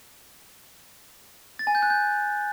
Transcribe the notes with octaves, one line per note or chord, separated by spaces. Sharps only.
A6
G#5
G6
F#6
G6